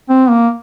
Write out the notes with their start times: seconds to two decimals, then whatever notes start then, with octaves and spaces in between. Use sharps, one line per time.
0.09 C4
0.30 A#3